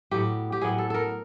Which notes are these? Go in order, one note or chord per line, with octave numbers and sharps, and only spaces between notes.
A2 F#3 B3 G4
G4
A2 F#3 B3 G#4
A4
A4 A#4